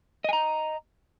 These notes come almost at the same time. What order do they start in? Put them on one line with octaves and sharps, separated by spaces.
D#5 G#5 A#5